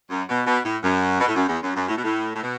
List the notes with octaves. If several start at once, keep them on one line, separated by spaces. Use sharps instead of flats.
F#2
B2
B2
A2
F#2
B2
A2
F#2
E2
F#2
F#2
A2
B2
A2
A2
B2